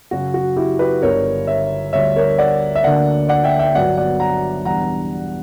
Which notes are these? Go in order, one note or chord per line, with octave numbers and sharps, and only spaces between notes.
F#2 C#3 F#3 F#4
F#4
E4 G4
G4 B4
G1 G2 D3 G3 A#4 C#5
C#5 E5
D2 D3 G3 C#5 E5
A#4 C#5
D5 F#5
E5
D2 D3 A#3 D4 D5 F#5
D5 F#5
E5 G5
E5 G5
G1 G2 F#3 B3 D5 F#5
D5 F#5
F#5 A#5
E2 B2 G3 B3 D4 F#5 A#5